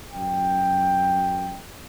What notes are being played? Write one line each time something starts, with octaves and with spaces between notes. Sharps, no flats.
F#2 G5